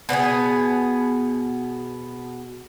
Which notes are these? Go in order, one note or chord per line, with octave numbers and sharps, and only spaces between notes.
B2 B3 D4 G#4